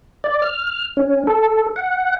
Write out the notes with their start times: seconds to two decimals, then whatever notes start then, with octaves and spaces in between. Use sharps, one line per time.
0.24 D5
0.42 F6
0.97 C#4
1.27 A4
1.76 F#5